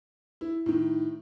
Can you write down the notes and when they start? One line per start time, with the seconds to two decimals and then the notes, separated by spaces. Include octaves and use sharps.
0.41 E4
0.66 A2 D#3